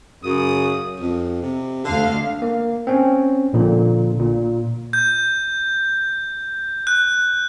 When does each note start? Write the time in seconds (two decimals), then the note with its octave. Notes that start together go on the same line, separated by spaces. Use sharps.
0.24 F#2 C#3 D#6
1.00 F2
1.42 C3
1.85 D2 D3 F5
2.42 A#3
2.87 C4 C#4
3.53 A#1 A#2 D3
4.19 A#2
4.93 G6
6.87 F#6